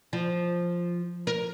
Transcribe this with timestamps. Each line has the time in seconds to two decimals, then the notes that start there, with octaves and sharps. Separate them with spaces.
0.13 F3
1.27 A#4